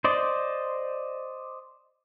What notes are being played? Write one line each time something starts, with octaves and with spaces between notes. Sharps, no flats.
C5 D5 D#5